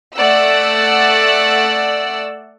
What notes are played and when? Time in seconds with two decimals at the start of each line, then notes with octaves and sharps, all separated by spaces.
0.15 A3 D5 F#5 E6